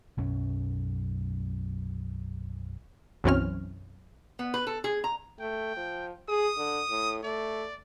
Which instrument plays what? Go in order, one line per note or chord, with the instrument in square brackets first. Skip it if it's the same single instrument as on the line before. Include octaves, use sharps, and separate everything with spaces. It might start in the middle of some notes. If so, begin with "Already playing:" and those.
[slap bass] B1 F#2 C#4
[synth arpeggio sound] B1 F#2 E3 C4 C#4 F6
[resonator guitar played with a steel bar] B3
B4
A4
G#4
A#5
[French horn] A3 [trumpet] G5
[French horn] F3
[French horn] G#4 [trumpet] D#6
[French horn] D3
A2
[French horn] A3 [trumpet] D5